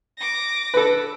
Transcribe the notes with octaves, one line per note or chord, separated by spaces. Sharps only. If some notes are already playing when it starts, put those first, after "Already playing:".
D6 A#6
A4 B4